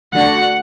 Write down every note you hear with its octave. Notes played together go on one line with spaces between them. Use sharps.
D3 A3 D4 F#4 F#5